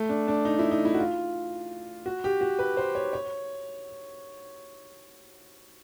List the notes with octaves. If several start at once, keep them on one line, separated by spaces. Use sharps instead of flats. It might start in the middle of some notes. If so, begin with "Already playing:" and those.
Already playing: A3
D4
D4
D#4
E4
D#4
E4
F#4
F4
F#4
G4
F#4
B4
C5
C#5
C#5